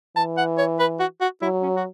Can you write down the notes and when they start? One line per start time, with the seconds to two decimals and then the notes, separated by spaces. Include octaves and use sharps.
0.16 E3 A5
0.37 F#5
0.58 C#5
0.79 B4
1.00 F#4
1.21 F#4
1.42 F#3 E4
1.62 C#4
1.76 F#4